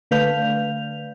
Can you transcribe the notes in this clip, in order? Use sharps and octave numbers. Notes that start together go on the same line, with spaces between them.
D3 A3 B4 F5 G6 F7